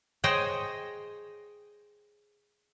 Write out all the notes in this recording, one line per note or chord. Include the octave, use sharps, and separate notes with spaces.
G#4 C5 C#5 D#5 G5